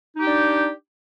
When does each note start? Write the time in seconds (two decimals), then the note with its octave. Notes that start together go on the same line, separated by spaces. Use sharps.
0.16 D#4
0.20 G4
0.25 D4